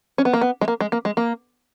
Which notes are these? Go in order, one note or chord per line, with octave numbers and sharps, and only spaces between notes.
C#4
B3
A#3
B3
G#3
A#3
G#3
A#3
G#3
A#3